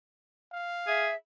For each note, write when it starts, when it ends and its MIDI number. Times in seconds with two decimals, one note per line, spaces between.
0.51 1.08 77
0.87 1.10 68
0.87 1.14 76